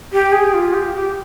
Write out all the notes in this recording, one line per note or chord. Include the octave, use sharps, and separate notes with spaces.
G4
G#4
F4
G4
G4